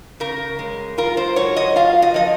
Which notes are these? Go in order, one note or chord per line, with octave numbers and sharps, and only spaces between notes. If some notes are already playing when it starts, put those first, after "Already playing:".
C#3 A#4
G#3
F4 A#4
C5
F#3 C#5
D#5
F4 F5
D#5
F3 D#5